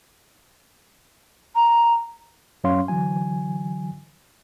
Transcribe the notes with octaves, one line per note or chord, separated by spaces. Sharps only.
A#5
F#2 F#3 C#4 C#5 F5 C6
D3 E3 F#3 G#5